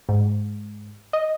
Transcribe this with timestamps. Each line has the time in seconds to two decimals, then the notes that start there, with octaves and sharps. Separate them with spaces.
0.09 G#2
1.13 D#5